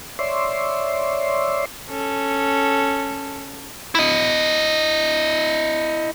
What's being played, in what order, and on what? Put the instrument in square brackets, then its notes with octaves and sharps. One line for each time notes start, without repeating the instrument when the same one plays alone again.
[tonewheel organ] C#5 D5 E5 C6
[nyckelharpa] C#4 A4
[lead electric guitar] E4 D#5